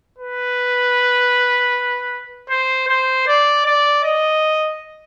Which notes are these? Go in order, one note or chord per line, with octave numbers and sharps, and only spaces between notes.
B4
C5
C5
D5
D5
D#5